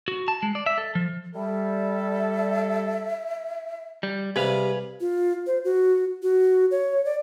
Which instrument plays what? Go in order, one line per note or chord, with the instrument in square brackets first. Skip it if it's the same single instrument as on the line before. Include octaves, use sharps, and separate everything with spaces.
[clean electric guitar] F#4
A5
G#3
D5
E5
A4
F3
[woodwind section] G3 [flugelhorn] A4 [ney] E5
[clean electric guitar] G3
[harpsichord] C3 G3 [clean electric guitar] G#4 B4 F5
[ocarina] F4
C5
F#4
F#4
C#5
D5